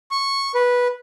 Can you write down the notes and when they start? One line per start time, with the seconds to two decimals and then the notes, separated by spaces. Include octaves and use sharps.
0.11 C#6
0.54 B4